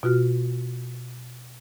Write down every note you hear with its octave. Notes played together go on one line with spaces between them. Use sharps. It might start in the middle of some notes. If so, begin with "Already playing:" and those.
B2 F4 F#4 F6